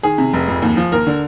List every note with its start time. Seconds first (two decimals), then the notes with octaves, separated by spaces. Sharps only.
0.03 D#3 G#4
0.18 C3
0.33 F1
0.48 F2
0.62 D#2
0.77 F3
0.92 D#2 A#4
1.07 D3